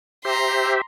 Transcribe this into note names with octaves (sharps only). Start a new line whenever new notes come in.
G4 C5 E5 A#5 C6